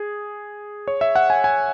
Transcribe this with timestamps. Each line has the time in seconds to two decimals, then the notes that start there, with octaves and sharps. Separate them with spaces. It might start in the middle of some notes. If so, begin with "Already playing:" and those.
Already playing: G#4
0.88 C#5
1.01 E5
1.16 F#5
1.30 G#5
1.44 G#5